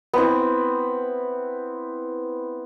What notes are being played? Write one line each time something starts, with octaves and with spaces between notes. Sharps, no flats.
B3 C4 E4